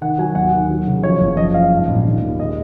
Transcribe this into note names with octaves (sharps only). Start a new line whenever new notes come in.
D#3 F#5
F#3 G#5
D#2 F#5
D#3
F#3
C#3
F3 C#5
F#1
F3 D#5
F3 F5
G#2
A#1
D#3
D#2
G#3 D#5